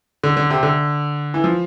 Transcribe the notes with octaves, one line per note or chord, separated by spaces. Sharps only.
D3
D3
C3
D3
E3
F3